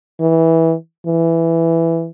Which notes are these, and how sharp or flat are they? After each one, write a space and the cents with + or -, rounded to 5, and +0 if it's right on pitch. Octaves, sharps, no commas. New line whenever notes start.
E3 -15
E3 +5